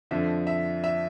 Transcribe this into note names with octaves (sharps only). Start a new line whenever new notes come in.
F2 D3 F3 E5
E5
E5